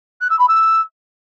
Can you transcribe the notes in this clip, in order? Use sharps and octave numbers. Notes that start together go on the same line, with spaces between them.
F#6
E6
B5
E6